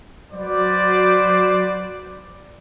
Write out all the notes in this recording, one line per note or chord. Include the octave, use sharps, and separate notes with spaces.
F#3 F#4 B4 C5 D5